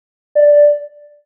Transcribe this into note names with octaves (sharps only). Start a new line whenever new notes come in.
D5